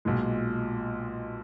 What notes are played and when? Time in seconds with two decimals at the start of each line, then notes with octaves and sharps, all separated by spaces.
0.05 B1 A#2 G#3